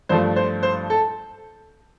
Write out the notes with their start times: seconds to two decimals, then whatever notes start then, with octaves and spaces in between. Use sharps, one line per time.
0.09 G2 F3 A3 C5
0.36 C5
0.63 C5
0.90 A4